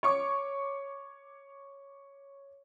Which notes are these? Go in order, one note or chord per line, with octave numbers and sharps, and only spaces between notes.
C#5 C#6 D6